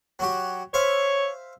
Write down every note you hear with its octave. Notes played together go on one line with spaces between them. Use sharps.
F#3 F#4 G4
C5 C#5 E5 F5